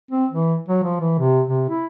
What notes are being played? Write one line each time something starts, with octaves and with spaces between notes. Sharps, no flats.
C4
E3
F#3
F3
E3
C3
C3
E4